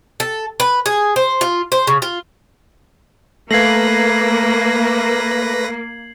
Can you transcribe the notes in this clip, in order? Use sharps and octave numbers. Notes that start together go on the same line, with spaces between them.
A4
B4
G#4
C5
F4
C5
C#3
F4
A3 A#3 B4 F5 G#6 A#6 C7 F#7